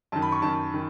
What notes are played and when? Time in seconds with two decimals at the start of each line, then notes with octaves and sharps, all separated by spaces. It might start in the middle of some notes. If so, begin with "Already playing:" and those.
0.12 F#2 D#3 A5
0.22 B5
0.32 C#6
0.42 F#2 D#3 A5
0.74 D#3